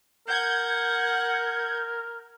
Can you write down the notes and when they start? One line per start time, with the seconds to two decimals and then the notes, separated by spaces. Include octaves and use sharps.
0.28 A#4 F#5 G6 G#6